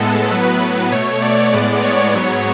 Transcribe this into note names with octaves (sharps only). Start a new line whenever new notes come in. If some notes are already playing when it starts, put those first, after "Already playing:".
Already playing: A2 G#3 B3 A4
A2 F#3 B3 B4
B2 A3 C#5
D5
A2 G#3 B3
C#5
G#2 F#3 B3